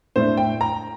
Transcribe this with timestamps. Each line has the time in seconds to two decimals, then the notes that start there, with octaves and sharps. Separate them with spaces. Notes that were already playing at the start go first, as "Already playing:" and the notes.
0.16 A2 A3 D4 C5
0.37 G5
0.61 A#5